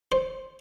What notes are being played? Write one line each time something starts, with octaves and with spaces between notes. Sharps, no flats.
C5